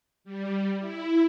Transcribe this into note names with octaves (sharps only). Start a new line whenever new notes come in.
G3
E4